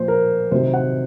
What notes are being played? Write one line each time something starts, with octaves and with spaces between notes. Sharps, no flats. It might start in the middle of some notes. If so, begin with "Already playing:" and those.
Already playing: A#2 F3 C5
A#4
C3 D#3 F#3 C5
F#5